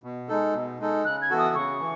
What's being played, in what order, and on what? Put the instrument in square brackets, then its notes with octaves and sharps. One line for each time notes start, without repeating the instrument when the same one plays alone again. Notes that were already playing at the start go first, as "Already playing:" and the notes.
[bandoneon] B2
G#3 D#4 A4
B2
G#3 D#4 A4
[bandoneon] C#3 [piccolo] F#6
[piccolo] G#6
[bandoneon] E3 B3 F#4 A4
[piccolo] D#6
[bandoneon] C#3 [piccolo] C#6
[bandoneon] E3